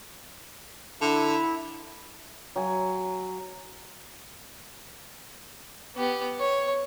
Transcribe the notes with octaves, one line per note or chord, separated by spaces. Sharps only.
D3 E4
F#3 G#5
B3 G4
C#5